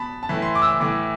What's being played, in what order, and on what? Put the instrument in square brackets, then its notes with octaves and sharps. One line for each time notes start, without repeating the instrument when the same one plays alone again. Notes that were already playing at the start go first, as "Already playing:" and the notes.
Already playing: [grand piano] B2 A5 B5
A5
A2 E3 B5
C6
D6
E6
D6
A2 E3 D6